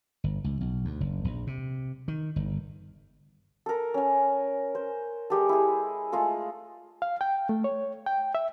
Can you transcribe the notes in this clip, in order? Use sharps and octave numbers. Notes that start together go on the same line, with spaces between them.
G1
C#2
B1
D2
F#1
A#1
C3
D#3
G1
A4 A#4
C#4 G#5
C5
G#3 G4 A4
E4 G#4
G#3 A3 F4 A4
F5
G5
A3
C#5
G5
E5